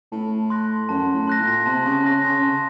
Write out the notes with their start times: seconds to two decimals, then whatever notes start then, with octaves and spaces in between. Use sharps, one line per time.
0.12 A2 A5
0.50 C6 F#6 A#6
0.89 F#2 A5
1.14 A2
1.27 C6 F#6 A#6
1.40 A#2
1.66 C3 A5
1.85 C#3
2.04 C#3 C6 F#6 A#6
2.24 C#3
2.42 C#3 A5